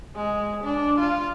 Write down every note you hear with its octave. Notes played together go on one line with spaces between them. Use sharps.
G#3
D4
F4